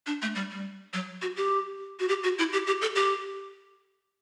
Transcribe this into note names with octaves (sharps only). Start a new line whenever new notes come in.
D4
A3
G3
G3
F#3
F#4
G4
F#4
G4
F#4
E4
G4
G4
A4
G4